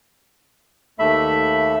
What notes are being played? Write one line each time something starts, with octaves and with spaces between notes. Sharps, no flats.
D#2 A3 E5 B5